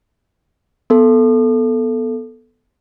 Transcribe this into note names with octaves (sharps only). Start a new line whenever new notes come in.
B3 A4